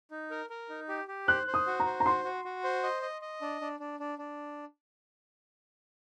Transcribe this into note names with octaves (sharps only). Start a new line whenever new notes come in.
D#4
A#4
A#4
D#4
G4
G4
C5 F#6
C5
D#6
F#4
A#5
C5
A#5
F#4 C6
F#4
F#4
C5
D#5
D#5
D#5
D4
D4
D4
D4
D4